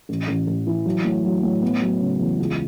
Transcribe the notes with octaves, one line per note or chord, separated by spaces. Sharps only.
A1
A1
A1
E3
F#3
A2
F#3
A2
B3
F#3
C#3
E2
C#2